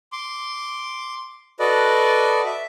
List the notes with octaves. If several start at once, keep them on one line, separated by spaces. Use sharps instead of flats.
C6 D6
F#4 A4 B4 D5 D#5
E5